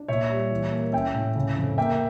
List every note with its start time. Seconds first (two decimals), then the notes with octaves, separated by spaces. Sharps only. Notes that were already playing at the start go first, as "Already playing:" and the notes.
Already playing: D4
0.08 A#2 C#5 E5
0.30 G3
0.51 E3
0.71 A#3
0.93 C#4 E5 G5
1.15 A2
1.36 C#3
1.57 F2
1.78 A#3 E5 G5